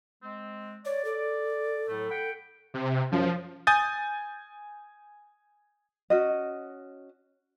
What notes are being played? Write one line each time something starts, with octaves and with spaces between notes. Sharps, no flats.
G#3 C4
C#5 D5
A4
A2 F#3 A3
F#5 G5 B5
C3
F#2 F3
G#5 D#6 G6 A6
C#4 F#4 D#5